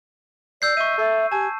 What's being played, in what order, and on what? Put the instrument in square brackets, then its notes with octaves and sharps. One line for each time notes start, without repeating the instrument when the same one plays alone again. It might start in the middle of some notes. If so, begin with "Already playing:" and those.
[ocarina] D5 [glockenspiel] E6 G6 C7
[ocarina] D#5 [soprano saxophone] E5 [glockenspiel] C#6 D#7
[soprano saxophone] A4 [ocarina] E5
[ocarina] G4 [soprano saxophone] G#5 [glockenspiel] A5